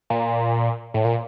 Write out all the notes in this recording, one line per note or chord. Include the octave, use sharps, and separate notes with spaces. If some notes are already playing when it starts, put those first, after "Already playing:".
A#2
A2
A#2